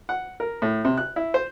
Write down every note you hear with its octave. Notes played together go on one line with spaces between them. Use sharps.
F#5
A#4
A2
C3
F#6
E4
C5